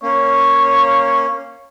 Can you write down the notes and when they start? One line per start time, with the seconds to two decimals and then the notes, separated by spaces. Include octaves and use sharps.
0.03 A#3 C#4 C#5